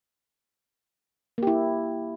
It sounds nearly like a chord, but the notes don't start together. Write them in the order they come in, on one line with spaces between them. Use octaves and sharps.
A#3 G4 E4